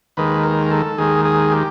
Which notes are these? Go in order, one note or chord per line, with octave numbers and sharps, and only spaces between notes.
D#2 D#3 G#3 B4
A#4
A4
D#2 D#3 G#3 G#4
G#4
G4